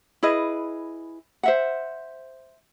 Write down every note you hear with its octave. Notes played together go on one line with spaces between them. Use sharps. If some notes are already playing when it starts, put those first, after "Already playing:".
E4 G#4 B4 D#5
C5 E5 F#5